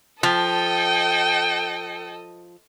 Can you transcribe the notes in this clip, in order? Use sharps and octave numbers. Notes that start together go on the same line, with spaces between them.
F3 A4 D#5 G5